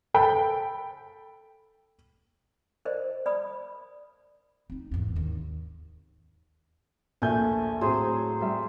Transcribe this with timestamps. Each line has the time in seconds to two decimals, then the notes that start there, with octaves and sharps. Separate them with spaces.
0.14 A4 G5 B5
2.85 A#4 C5 D5 D#5
3.26 D5 B5 D#6
4.70 C4 D#4
4.92 G#1 E2
5.16 D#2 D#3
7.22 A#1 D#2 A3 G#5 G6
7.81 A2 F#3 C4 G#4 C5
8.41 G3 E5